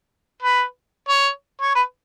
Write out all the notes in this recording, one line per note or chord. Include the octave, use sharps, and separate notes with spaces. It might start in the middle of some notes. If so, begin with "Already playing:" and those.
B4
C#5
C#5
B4